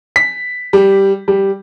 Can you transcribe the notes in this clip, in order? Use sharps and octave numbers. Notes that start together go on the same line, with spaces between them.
B6
G3
G3